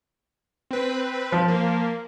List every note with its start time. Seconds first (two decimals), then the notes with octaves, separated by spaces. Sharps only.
0.71 C4 B4
1.32 F3
1.48 A#3